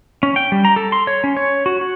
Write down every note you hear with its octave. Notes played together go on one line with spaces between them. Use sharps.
C#4
G5
G3
A#5
A4
C6
C#5
C#4
C#5
F#4
F#4